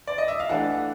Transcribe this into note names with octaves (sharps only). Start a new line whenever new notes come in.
D5
D#5
E5
F5
E3 A3 D4 F#5